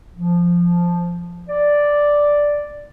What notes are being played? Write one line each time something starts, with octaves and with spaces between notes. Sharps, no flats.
F3
D5